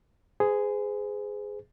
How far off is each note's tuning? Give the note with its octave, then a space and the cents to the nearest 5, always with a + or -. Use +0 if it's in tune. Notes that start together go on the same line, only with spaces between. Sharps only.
G#4 +0 C5 -45